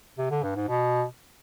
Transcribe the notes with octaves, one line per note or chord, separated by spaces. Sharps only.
C3
D3
G2
G#2
B2